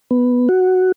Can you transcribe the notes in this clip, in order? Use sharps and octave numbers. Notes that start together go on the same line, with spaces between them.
B3
F#4